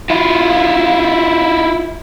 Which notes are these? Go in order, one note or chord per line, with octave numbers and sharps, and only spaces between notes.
E4 F4